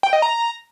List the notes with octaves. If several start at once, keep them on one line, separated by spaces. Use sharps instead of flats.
G5
D#5
A#5